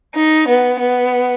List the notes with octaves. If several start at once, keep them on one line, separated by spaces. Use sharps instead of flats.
D#4
B3
B3